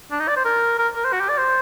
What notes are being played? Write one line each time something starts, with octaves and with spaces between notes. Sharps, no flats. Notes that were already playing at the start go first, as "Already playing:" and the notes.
D4
D#4
D5
C5
A#4
A#4
A#4
C5
F#4
G4
D5
C5